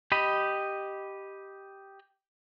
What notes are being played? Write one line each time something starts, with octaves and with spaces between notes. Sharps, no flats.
G4 D#5 B5